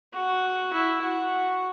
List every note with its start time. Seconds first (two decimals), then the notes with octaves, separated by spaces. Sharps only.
0.14 F#4
0.73 E4
1.02 F#4